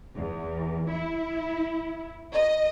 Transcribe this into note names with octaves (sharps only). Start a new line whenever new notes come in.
E2
E4
D#5